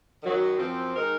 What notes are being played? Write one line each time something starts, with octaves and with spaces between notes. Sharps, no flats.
F#2 D#3 F#3
F#2 F3 C4
D#3 G#3 D#4 A#4